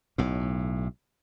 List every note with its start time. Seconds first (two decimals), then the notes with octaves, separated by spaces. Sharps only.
0.18 B1 A2